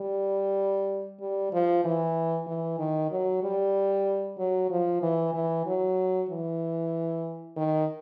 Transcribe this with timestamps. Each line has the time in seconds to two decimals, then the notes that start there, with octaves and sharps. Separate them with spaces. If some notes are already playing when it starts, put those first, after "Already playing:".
Already playing: G3
1.20 G3
1.53 F3
1.84 E3
2.47 E3
2.79 D#3
3.11 F#3
3.43 G3
4.38 F#3
4.70 F3
5.02 E3
5.34 E3
5.66 F#3
6.29 E3
7.57 D#3